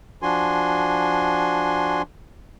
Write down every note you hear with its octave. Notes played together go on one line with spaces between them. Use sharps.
F3 D4 F#4 G#5 C6